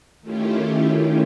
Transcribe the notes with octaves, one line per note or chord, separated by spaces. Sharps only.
D#3 A3 C#4 E4 F4 G4